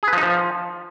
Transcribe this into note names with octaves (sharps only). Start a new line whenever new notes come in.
G#4
B4
F3
D#4
F3